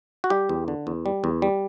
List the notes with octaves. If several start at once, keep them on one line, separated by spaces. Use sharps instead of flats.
F#4
G3 G4
E2
D3
E2
G3
E2
G3